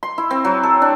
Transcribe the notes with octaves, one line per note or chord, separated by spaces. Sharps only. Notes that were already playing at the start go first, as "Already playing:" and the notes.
C6
E4
C4
F#3
A4
D4